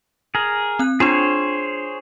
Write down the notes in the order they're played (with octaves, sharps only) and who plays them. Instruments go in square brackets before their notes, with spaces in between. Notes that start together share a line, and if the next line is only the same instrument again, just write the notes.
[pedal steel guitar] G#4 A#4
[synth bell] C4 F#6
[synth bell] D4 F4 [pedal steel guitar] G#4 C5 C#5